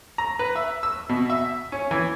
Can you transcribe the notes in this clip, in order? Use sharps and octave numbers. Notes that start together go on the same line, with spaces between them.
A#5
B4
E5
E6
B2
E5
C#4
E3